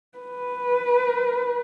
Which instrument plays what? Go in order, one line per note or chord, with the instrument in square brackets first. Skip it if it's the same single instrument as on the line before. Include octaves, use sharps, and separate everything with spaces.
[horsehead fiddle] B4